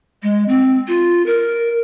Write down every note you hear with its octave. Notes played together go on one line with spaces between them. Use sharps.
G#3
C4
F4
A#4